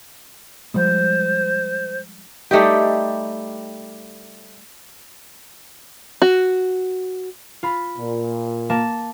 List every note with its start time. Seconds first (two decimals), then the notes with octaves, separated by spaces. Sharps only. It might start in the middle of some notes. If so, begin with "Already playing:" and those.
0.74 F3 G3 G#3 C5
2.51 G3 A3 D#4 G4
6.22 F#4
7.63 F4 B5
7.97 A#2
8.70 A#3 A5